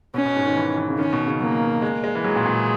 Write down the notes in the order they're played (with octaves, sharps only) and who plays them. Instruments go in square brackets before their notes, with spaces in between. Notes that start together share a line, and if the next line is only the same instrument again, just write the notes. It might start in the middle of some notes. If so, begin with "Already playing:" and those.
[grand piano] B2 [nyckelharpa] C#4
[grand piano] B2
G#2
D#3
E3
E3
C#3
[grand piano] D#3 [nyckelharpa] C#4
[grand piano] B2
C#3
[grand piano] F#3 [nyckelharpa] A#3
[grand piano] G#3
G#3
E3
[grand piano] F#3 [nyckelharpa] G#3
[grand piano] A#2
A#2